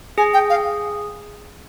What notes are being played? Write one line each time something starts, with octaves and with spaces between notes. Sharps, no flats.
G#4 G#5
G5
F5